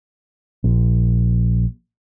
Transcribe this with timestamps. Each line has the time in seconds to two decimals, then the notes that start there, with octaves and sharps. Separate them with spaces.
0.64 A#1